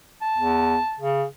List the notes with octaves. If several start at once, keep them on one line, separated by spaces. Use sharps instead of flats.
A5
E2
C#3